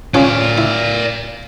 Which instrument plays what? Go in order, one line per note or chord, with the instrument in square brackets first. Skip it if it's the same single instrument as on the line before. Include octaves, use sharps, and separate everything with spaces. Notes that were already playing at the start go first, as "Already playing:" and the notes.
[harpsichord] C#4 F4 G#4 [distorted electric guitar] D5 F5
[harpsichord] E4